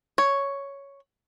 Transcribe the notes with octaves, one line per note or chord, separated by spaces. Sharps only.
C#5